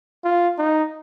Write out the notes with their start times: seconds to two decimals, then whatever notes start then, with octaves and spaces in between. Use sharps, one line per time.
0.24 F4
0.59 D#4